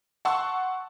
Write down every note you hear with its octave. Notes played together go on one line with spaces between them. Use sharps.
F#5 A5 C6 C#6 E6